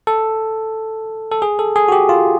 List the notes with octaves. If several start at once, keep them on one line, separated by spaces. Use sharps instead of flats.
A4
A4
G#4
A4
G#4
F#4
G4
F4